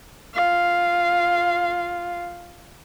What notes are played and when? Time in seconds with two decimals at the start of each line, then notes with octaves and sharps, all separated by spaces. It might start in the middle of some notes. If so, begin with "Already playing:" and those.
0.34 F4 F5